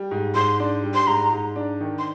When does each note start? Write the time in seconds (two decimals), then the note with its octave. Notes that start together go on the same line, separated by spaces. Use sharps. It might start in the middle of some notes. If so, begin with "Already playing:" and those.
Already playing: G3
0.11 G#2
0.35 G#2 C6
0.60 D4
0.83 G3
0.94 C6
1.07 G#2 A#5
1.32 G#2
1.56 D4
1.81 D#3
1.99 C6